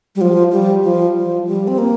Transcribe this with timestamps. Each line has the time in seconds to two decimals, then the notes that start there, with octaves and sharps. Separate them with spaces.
0.16 G3
0.21 F3
0.52 G3
0.84 F3
1.16 F3
1.47 G3
1.68 C4
1.78 A#3